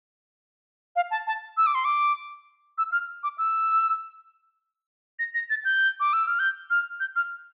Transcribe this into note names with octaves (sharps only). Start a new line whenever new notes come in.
F5
A5
A5
E6
D6
C6
D6
E6
F6
D6
E6
A#6
A#6
A6
G6
D6
E6
F6
G6
F6
G6
F6